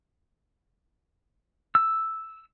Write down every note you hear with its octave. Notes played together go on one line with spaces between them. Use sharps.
E6